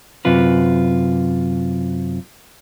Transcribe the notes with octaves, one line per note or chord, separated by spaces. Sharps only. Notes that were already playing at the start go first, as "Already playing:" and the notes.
F#2 C3 F4 B4